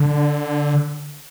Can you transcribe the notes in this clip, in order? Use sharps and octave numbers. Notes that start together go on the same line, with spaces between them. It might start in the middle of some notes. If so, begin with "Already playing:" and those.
Already playing: D3